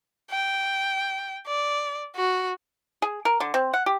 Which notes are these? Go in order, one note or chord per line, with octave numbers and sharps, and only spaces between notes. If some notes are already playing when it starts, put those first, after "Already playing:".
G5
D5
F#4
G#4
A#4
D3
C4
F#5
G4